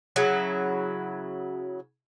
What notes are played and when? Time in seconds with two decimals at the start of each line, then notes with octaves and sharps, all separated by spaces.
0.16 C#3 F#3 E4